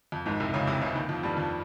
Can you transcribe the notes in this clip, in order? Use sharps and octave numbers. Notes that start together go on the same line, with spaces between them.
F2
G#1 G#2
C2 C3
C#2 C#3
C2 C3
C#2 C#3
D#2 D#3
F2 F3
G2 G3
F2 F3